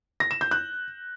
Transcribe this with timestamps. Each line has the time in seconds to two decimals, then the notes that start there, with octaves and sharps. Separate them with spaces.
0.20 A#6
0.31 E7
0.41 G6
0.51 F#6